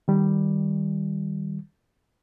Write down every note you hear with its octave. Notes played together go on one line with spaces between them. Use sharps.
D#3 G3